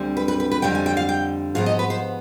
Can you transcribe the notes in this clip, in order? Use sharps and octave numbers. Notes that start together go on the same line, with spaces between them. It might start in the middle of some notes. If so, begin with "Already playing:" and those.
Already playing: D2 D3 G3 C4
B4
B4
B4
B4
F2 D3 G3 G5
G#5
G5
F5
G5
G#2 F3 B3 F5
D#5
B4
C5